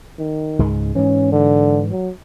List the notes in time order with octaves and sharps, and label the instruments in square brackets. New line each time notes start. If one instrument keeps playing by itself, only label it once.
[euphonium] D#3
[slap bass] C#2 G#2 G#3
[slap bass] G#2 E3 [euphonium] C#4
[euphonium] D3
F#3